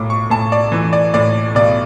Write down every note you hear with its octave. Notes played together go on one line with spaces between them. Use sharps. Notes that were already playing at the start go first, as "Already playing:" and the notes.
Already playing: B1 A2 D6
C#6
A2 A5
D5
E3
D5
A2 D5
B1 D5